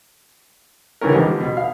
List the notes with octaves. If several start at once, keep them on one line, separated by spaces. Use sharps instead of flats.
D3 E3 G3 C#4 A#4
D3 E3 F3 G3 G#3
B2
F5